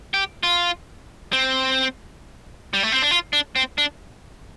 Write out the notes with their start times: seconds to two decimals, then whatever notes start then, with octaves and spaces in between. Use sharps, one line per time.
0.14 G4
0.43 F4
1.33 C4
2.74 G3
2.83 A3
2.92 C4
3.02 D4
3.11 F4
3.33 D4
3.56 C4
3.78 D4